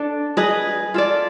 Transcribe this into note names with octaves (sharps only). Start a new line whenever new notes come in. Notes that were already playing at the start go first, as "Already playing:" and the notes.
Already playing: D4 A4 D5
G#4 B4 D#5
F4 A4 D5